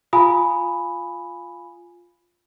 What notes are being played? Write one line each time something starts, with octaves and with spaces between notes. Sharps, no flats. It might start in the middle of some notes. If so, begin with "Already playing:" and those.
F4 F5 G#5 B5 D#6